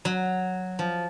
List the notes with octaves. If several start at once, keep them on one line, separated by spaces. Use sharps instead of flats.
F#3
F3